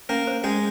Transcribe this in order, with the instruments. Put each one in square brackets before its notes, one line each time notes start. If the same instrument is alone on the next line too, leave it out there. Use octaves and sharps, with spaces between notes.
[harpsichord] A#3 A#4 [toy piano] C#4
[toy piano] C5
[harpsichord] G#3 G#4 [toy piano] C#4